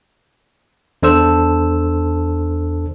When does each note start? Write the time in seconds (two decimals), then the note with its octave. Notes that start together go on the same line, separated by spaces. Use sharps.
1.03 E2 D4 A4 C5 E6